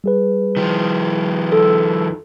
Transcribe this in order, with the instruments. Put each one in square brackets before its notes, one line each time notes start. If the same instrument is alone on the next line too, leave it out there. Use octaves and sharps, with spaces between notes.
[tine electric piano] G3 G#4 B4
[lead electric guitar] D#3 F3
[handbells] A4